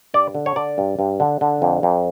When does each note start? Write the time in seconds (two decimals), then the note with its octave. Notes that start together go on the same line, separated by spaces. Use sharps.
0.14 G2 D5
0.35 D3
0.46 C#5
0.56 D3 D5
0.78 G2
0.99 G2
1.20 D3
1.41 D3
1.62 F2
1.83 F2